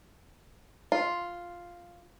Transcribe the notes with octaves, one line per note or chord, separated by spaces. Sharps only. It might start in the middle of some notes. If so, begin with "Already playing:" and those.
F4